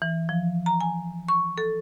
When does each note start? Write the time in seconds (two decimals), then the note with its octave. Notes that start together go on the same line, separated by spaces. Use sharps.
0.02 E3
0.29 F3
0.66 A#5
0.81 G#5
1.28 C#6
1.58 A4